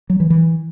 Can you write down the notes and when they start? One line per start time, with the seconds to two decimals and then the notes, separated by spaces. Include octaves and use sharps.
0.10 F#3
0.20 E3
0.30 E3